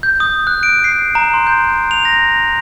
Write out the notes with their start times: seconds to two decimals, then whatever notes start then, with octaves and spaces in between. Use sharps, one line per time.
0.03 G6
0.20 D#6
0.47 F#6
0.63 D7
0.84 C7
1.15 A#5
1.34 C6
1.47 G6
1.91 F7
2.05 A#6